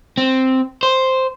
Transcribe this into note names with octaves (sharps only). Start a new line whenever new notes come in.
C4
C5